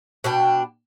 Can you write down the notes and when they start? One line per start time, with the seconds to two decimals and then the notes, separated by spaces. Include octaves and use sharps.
0.24 B2 D4 G5